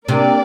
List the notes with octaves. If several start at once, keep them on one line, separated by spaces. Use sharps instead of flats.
C3 A#3 D4 A#4 D5